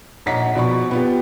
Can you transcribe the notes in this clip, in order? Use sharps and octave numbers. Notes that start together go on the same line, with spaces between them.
A#1 C#5 D#5 F#5 A#5 B6
B2 F3 D5 B5 C#6
B3 F4 G4